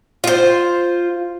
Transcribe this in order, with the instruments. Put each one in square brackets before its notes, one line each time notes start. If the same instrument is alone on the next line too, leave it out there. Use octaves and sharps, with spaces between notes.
[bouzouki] F4 C5